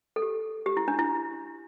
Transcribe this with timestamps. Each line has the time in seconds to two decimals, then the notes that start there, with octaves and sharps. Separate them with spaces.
0.16 A4
0.22 G4
0.66 G4
0.77 E4
0.88 D4
0.99 E4